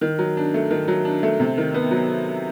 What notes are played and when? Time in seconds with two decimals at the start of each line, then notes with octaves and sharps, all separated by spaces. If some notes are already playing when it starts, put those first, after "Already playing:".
0.01 D#3
0.19 F#3
0.37 D4
0.54 A3
0.71 D#3
0.88 F#3
1.05 D4
1.23 A3
1.40 C3
1.58 D#3
1.74 B3
1.91 F#3